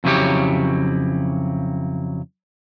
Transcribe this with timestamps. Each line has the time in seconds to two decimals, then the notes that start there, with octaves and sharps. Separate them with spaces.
0.04 F2 C#3 F#3 E4 G4 C#5